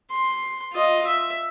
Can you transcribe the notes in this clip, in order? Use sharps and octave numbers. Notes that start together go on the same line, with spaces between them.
C6
F4 D#5
E5